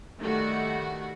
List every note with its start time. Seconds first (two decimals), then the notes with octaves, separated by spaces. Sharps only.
0.18 D#3 G3 A3 F#4